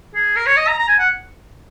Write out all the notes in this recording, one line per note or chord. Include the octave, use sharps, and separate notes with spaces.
G#4
A#4
C#5
D#5
A#5
A#5
G#5
F#5